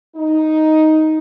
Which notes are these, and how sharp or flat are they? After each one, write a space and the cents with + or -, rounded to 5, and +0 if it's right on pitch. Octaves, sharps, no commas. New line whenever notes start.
D#4 +5